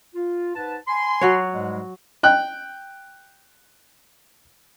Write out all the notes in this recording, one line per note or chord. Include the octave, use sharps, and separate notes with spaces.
F4
G#2 B4 A5
G#5 B5 C6
F#3 F#4 C#5
G#2 G3 G#3
G5 F#6